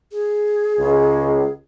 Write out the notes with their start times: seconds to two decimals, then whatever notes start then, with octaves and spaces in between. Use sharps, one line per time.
0.12 G#4
0.79 C#2